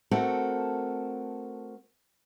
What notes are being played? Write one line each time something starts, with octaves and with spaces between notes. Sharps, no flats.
A3 C4 F#4 A4 A#4 F#5